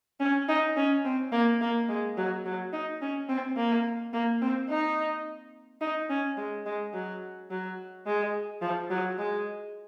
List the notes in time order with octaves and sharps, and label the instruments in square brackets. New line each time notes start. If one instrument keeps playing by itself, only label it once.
[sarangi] C#4
D#4
C#4
C4
A#3
A#3
G#3
F#3
F#3
D#4
C#4
C4
A#3
A#3
C4
D#4
D#4
C#4
G#3
G#3
F#3
F#3
G#3
F3
F#3
G#3